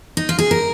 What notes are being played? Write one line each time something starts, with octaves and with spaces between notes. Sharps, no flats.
D#4
F4
G#4
A#4